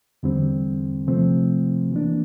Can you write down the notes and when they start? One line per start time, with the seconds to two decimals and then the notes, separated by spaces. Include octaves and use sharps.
0.23 E2 D3 G3 C4
1.07 C3 F3 A3 C4
1.91 E3 A#3 D4